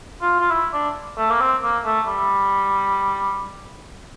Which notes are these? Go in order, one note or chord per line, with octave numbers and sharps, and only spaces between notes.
F4
F4
E4
D4
A3
A#3
C4
A#3
A3
G3